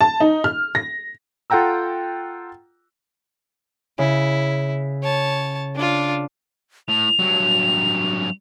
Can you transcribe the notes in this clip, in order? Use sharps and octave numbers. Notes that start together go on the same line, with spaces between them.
A5
D#4
F6
A#6
F4 A4 F#5 G5 A#5 E6
C#3 E4
C#5 A5
D4 F4
A2 F7
G2 F#3